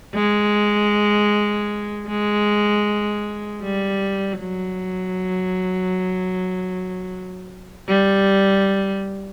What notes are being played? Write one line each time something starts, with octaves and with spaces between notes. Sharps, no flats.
G#3
G#3
G3
F#3
G3